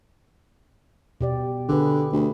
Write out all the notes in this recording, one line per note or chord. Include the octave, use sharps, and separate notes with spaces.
B2 G4 D5
D3 G4 G#4 B4
D2